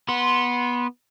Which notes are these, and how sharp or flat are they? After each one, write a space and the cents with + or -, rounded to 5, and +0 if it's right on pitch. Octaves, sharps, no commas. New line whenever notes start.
B3 -15 C6 +0